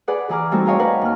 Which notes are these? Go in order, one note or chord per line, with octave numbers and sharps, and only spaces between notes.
G#4 B4 D5 F#5
E3 E4 G#4 A#5 D6 F6
G3 A3 C4 D#4 E4 F#4
C#5 D#5 F5 G5 G#5 A#5
D4 A#4 B4 C#5 F#5
D#2 F6